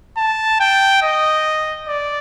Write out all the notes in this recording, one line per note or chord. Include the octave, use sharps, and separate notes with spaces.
A5
G5
D#5
D5